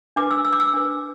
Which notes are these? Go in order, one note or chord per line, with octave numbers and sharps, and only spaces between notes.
D4 B4 D6
E6
E6
D6
E6
D4 B4